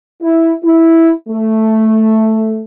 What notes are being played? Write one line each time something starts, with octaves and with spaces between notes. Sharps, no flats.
E4
E4
A3